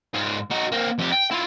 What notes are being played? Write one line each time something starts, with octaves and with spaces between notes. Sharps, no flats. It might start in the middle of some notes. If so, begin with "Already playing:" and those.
G#2 F4
D#4 F#4
A#3 C4
F2 G4
G5
E4 F4